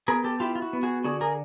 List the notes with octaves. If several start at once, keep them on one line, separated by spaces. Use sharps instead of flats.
B3 G#4 A#4
G4 A4
E4 F4 G4
F4
F#4
B3
F#4 G#4
D3 F#4 G#4
G#4 A#4